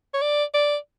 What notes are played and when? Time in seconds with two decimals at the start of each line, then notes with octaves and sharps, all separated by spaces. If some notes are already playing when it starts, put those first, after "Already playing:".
0.14 C#5
0.22 D5
0.54 D5